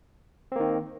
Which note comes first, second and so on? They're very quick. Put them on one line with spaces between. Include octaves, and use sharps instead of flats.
C4 A#3 D#3